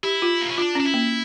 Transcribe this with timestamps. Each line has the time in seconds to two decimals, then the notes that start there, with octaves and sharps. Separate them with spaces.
0.03 E4 G4
0.22 F4
0.42 A#3
0.50 C#4
0.58 D4 F4
0.75 C#4 D4
0.85 E4
0.94 A#3